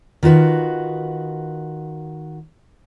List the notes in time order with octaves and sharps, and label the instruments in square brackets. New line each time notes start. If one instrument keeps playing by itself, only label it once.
[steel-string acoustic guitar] D#3 F4 F#4 B4